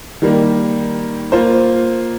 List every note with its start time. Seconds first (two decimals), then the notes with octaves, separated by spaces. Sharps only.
0.22 D#3 G3 A#3
1.32 A#3 F4 C5